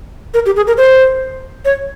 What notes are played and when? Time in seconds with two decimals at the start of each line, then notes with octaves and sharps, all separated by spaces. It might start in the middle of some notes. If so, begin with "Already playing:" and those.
0.34 A#4
0.46 G4
0.56 G#4
0.67 A#4
0.78 C5
1.65 C#5